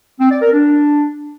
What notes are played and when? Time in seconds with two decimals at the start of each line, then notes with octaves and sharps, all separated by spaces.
0.19 C4
0.31 D5
0.42 A#4
0.53 D4